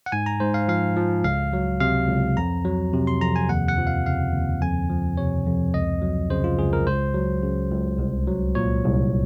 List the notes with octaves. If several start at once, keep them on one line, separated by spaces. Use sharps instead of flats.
F#5
G#2 G#5
A#5
G#2 C5
F5
F3 F5
F3
C#2 F5
F#3
C3 F5
C#2
F2 A#5
F#3
C3
C6
F2 A#5
G#5
D#2 F#5
F#5
F3
F5
C#3 F5
D#2
F2 G#5
F3
C3 C#5
F2
C#2 D#5
F#3
C#3 C5
F4
C#2 G#4
A#4
C#2 C5
F#3
C#3
C#2
C2
F#3
A#2 C#5
C2